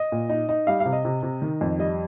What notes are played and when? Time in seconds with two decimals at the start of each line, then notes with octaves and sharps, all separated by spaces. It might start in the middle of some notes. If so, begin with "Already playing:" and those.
Already playing: D#5
0.12 A#2
0.29 D#4
0.49 D#4
0.67 G3 F5
0.80 F5
0.85 C3
0.93 D#5
1.05 C3
1.23 C3
1.42 D#3
1.61 F2
1.79 G3 D#5